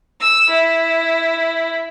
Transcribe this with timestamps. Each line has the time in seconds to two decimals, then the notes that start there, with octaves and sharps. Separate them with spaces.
0.20 E6
0.49 E4